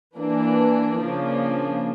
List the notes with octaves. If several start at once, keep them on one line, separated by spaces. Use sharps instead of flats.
E3 A#3 D4
C#3 F3 A#3 D4